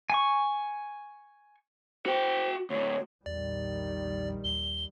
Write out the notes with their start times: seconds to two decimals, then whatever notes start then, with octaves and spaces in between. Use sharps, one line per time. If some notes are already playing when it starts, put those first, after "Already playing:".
0.10 G#5 C#6
2.06 F#4 C5 G5
2.70 D2 A2 C#5
3.26 A#1 E2 D#3 G3 D5
4.44 D#2 G7